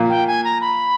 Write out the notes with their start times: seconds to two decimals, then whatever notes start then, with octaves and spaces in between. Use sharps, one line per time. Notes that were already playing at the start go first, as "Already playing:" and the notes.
Already playing: A#2
0.09 G5
0.27 G#5
0.44 A#5
0.61 B5